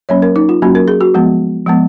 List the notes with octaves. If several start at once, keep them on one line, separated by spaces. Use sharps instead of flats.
F#3 A#3 C#4 C#5
A#4
D#4
F4
F#3 A#3 C#4 F#4
A#4
G#4
F#4
F3 G#3 B3
F3 G#3 B3